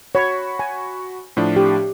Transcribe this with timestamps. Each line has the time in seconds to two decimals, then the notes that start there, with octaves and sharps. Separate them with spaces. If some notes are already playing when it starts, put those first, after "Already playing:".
0.15 F#4 C#5 B5 C#6
0.59 G#5
1.37 A2 F3 D4
1.56 G4